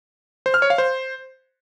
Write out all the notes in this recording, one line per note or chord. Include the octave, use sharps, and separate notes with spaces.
C5
F6
C#5
F5
C5